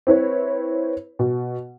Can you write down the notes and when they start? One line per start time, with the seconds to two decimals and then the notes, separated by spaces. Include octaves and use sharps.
0.07 C4 E4 B4 C#5
1.19 B2